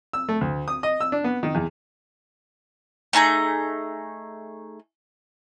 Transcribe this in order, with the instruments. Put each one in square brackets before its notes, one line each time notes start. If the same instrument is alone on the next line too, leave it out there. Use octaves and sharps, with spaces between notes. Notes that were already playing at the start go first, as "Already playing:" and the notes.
[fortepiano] E6
A3
D2
D#6
D#5
E6
D4
B3
D#3
E2
[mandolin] A3 D#4 G#4 A#5